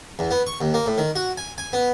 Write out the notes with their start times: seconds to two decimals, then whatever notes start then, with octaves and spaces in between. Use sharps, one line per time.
0.19 E2
0.31 B3
0.47 C#6
0.61 D#2
0.74 A#3
0.86 A2
0.98 D#3
1.16 F#4
1.37 G#5
1.58 G#5
1.73 B3